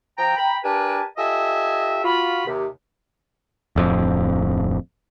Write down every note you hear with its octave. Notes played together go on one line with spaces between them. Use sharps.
F3 G5 A#5
G5 A#5 B5
D4 G4 A#4 B4 G#5 A5
F4 G4 A4 D#5 E5 G#5
F4 F#4 B5
D#2 C3
D1 F2